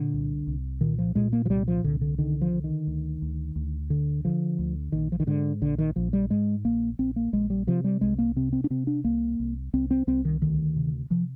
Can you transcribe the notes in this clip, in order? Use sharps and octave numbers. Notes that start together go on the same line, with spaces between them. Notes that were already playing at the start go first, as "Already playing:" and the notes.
Already playing: A#2 D3
C2
C2
A#2 D#3
F3
A#2 G#3
A#3
F3
C2 G3
F3
C2 D3
D3
D3 D#3
F3
D3
D#3
D2
D2
D2
D3
D3 F3
D2
A#1 D#3
F3
D#3
G#2 D3
A#1 D3
D#3
A#1 F3
G3
G#2 G#3
A#1 A#3
A#1 C4
A#3
A#1 G#3
G3
C3 F3
G3
C2 G#3
A#3
C3 C4
C4
D4
C3 C4
D4
C2 A#3
C2
C2 C4
C4
C2 C4
D#3
D2 D#3
C3
C3 F3